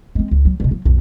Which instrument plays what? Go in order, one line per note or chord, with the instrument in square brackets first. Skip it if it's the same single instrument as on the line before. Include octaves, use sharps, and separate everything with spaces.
[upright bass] G#3 C4
C#2
F#3
G2 B2
F#3
B1 F2